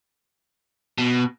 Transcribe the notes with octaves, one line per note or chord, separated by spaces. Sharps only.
B2